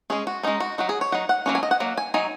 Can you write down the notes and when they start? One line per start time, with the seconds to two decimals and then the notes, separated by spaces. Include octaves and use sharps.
0.10 G#3 C#4 G#4
0.27 F#4
0.43 G#3 C#4 D#4
0.60 F#4
0.78 F#3 D#4 F#4
0.89 G#4
1.01 C#5
1.12 F#3 D#4 F#5
1.29 F#5
1.46 F#3 A#3 C#4
1.55 G#5
1.63 D#5
1.71 F#5
1.80 F#3 A#3
1.98 G#5
2.14 F#3 D#4 G#5